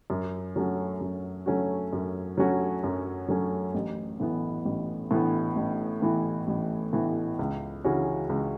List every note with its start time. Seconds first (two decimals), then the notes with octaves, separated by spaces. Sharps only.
0.10 F#2
0.56 F#3 A3 C#4 F#4
1.01 F#2
1.46 F#3 A3 C#4 F#4
1.93 F#2
2.38 F#3 A3 C#4 F#4
2.84 F#2
3.28 F#3 A3 C#4 F#4
3.74 A1
4.20 A2 E3 B3
4.65 A1
5.11 A2 E3 B3
5.56 A1
6.02 A2 E3 B3
6.48 A1
6.93 A2 E3 B3
7.39 C#2
7.84 C#3 E3 C#4 F#4
8.29 C#2